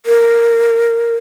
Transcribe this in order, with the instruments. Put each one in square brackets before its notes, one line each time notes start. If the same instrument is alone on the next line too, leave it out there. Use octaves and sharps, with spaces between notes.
[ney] A#4